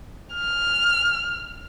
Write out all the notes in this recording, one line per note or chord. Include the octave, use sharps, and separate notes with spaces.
F6